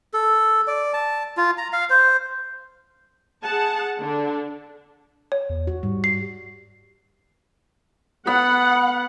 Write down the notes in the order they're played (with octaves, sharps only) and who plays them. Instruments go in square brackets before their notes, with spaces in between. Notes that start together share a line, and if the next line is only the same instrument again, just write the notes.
[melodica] A4
D5
A5
F4
A#5
F5
C5
[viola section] G#4 F#5 A5
D3 D4
[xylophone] C#5
[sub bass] E2
[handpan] F#4
[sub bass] G#2 [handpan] G3
[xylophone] C7
[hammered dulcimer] B3 [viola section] F#5 [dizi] B5